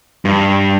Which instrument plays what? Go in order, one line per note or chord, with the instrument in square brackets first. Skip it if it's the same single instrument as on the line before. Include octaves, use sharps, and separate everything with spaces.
[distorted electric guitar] G2